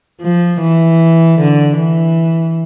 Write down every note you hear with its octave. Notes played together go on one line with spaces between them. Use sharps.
F3
E3
D3
E3